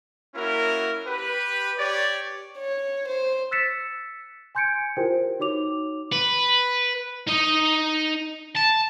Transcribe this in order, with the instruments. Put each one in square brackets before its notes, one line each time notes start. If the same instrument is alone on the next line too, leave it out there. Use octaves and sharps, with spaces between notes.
[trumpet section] A#3 C#4 E4 F#4 A#4
G4 B4
G4 C#5 D5
[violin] C#5
C5
[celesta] E6 F#6 A6 B6 C#7 E7
G#5 C6 G6 G#6 C#7 D7
E4 F4 G4 A#4 C5 G5
D#4 F#4 C#5 D6 F7
[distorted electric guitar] B4
D#4 D#5
A5